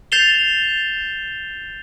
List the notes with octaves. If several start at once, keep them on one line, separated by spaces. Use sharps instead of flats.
G6 A6 C7 E7 F7 G7